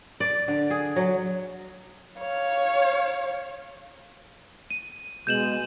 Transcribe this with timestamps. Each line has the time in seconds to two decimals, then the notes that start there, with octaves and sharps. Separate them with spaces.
0.20 D5
0.48 D3
0.70 G#4
0.96 F#3
2.19 C#5 F5
4.70 D#7
5.27 B2 G#3 G6 E7 F#7